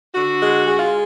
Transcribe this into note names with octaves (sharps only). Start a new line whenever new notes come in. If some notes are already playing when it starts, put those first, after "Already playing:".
D3 F#4
G#3
G#3
F4